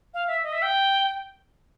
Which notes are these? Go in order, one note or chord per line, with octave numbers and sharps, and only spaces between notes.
F5
E5
D#5
E5
G5